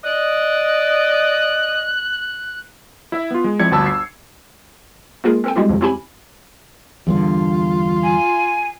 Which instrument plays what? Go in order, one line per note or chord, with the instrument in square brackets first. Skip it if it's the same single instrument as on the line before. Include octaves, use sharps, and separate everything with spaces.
[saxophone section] D5 D#5 [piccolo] F#6
[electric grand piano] E4 E5
B3 F4
G#3
F2 C4 E4 D5 G#6 C#7
G1 D2 F#4 A5 B5 E6
C7
[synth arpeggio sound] G#3 A#3 F4 G#4 A#4
C4 A4 G5
G3 G#3 C4 E4 F#4 G4
F2 C3
C4 C#4 E4 G4 G#5 B5
[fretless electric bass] E2 G2 D3 [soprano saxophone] F4
[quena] G#5